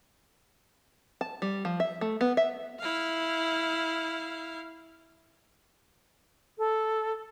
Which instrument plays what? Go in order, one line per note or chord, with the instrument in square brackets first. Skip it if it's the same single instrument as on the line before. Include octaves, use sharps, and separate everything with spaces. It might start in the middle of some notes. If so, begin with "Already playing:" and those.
[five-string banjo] A5
G3
F3
E5
A3
B3
E5
[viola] E4 F5
[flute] A4